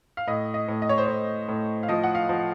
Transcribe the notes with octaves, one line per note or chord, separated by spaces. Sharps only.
F5
A2 D#5
D#5
A2
D#5
C#5
C5
A2 C#5
A2
F5
F3 D#5
F#5
F5
F3